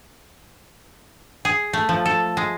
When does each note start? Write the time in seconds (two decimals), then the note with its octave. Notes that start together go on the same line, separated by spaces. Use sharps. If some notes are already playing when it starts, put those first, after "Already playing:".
1.45 G#4
1.73 A3
1.89 F3
2.06 A4
2.37 G#3